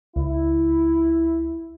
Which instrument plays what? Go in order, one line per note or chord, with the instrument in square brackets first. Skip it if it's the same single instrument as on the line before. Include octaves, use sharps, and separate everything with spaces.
[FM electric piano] C#2 [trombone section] E4